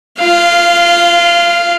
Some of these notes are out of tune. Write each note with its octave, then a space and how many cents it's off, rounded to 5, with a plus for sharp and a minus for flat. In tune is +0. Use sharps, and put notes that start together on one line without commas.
F4 -25 F5 +0